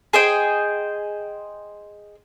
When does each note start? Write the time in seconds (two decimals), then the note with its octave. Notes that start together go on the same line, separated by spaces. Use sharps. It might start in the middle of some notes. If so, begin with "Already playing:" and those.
0.13 G#4 C5 D#5 G5